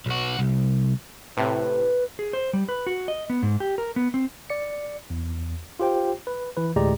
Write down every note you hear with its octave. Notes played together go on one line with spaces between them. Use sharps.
B1 F#4
C2
A2 C3 B4
G#4
C5
G3
B4
F#4
D#5
B3
G#2
G4
A#4
B3
C4
D5 C#7
E2
F4 G4 C5 G5
B4
E3 B4
D2 A2 G#3 G4 D5 A#5